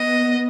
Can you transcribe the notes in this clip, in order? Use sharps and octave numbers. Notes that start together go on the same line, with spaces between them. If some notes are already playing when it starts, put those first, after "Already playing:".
Already playing: B3 D#5